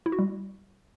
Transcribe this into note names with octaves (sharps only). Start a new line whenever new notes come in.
E4
F#4
G3